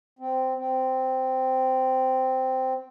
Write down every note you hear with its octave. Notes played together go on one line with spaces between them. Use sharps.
C4
C4